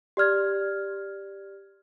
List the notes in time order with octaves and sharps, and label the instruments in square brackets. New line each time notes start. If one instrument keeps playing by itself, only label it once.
[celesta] G4 D5 F6 G#6